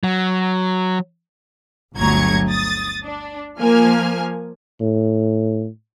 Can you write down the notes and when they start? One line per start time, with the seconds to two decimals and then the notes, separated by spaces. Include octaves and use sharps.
0.04 F#3
1.95 G1 D2 F#3 A#5 C#6 G#6
2.49 D#6 A6
3.04 D4
3.58 F3 A#3 G#5 F6
4.81 A2